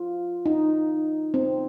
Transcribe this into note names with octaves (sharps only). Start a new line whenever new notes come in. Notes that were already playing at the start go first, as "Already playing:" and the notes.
Already playing: F4
D#4
C4